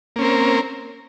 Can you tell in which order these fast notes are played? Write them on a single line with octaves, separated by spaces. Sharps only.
A#3 C#4 C4 A#4